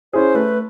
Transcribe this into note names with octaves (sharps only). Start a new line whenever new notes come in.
C#4 E4 G#4 C5
A3 B4